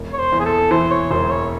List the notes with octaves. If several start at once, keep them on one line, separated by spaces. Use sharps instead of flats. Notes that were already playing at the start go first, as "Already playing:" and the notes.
Already playing: E1
C#5
C5
E2
G#4
A4
E3 C5
C#5
E1 C5
C#5